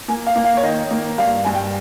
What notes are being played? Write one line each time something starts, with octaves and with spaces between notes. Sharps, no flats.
A#3 G#5
F5
A#3
F5
C#5
D#3 D#5
A#3
G2 F5
G2 G#5
G5